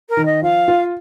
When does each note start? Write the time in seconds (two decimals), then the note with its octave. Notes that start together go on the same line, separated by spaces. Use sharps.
0.09 A#4
0.17 D#3
0.25 D#5
0.42 F3 F5
0.68 F4